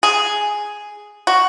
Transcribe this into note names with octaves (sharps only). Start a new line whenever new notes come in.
G#4
F#4